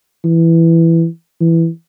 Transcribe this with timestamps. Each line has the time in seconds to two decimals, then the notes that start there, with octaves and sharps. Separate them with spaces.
0.24 E3
1.40 E3